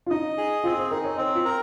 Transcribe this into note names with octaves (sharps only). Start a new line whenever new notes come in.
F4
D#4 D#5
G#4
C4 F4
C5
D#4 A#4
C#5
C4 C5
F4
A#4